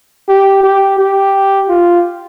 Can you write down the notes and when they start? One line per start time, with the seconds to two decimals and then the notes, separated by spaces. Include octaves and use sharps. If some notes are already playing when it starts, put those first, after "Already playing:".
0.29 G4
0.64 G4
0.98 G4
1.69 F4